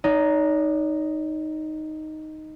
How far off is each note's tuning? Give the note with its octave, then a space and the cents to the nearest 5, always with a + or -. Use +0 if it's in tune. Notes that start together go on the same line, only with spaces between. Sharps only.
D#4 +0 C#5 +45